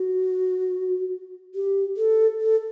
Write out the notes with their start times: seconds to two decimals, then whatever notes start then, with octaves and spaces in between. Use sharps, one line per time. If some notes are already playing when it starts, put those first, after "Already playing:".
Already playing: F#4
1.55 G4
1.97 A4
2.41 A4